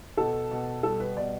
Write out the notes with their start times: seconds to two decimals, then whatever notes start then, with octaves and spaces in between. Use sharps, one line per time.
0.17 B2 A4
0.51 B2
0.83 G3 A4
1.00 B4
1.16 B2 D5